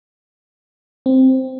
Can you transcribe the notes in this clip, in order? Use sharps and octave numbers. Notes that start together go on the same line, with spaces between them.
C4